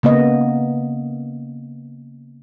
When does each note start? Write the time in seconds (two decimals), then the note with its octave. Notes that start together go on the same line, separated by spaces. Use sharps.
0.03 C#3 A#3 B3 D#5